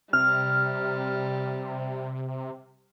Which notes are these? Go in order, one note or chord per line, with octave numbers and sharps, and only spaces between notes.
C3 G3 F6